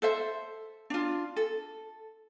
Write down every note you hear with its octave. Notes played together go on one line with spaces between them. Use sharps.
A4 C5 E5
D4 F4
A4